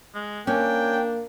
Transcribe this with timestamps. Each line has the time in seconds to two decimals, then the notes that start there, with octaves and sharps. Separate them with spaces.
0.14 G#3
0.47 A#3 C#4 D4 G5